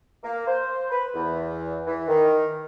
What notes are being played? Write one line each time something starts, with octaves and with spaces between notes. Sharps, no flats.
A#3
C5
B4
E2
E3
D#3